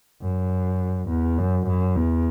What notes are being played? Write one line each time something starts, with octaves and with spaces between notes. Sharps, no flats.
F#2
E2
F#2
F#2
E2